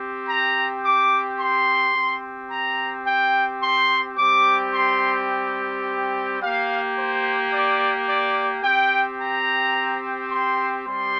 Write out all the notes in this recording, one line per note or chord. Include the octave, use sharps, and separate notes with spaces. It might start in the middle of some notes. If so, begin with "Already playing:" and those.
Already playing: C4 G4
A#5
D6
C6
C4 G4
A#5
G5
C6
G3 C4 G4 D6
C6
A#3 G4 F5
C5
D5
D5
C4 G4 G5
A#5
C6
G3 C4 G4 C6